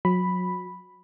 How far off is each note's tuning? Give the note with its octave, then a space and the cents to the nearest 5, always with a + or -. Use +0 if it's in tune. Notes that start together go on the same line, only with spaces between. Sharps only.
F#3 -30 B5 +0